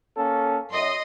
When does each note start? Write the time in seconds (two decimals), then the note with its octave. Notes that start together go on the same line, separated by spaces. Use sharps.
0.17 A#3 C#4 A4
0.72 F#2 D#5 C6